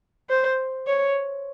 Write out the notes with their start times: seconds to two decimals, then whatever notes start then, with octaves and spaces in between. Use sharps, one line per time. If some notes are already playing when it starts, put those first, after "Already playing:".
0.29 C5
0.87 C#5